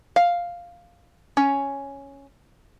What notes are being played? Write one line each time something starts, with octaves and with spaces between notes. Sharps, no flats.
F5
C#4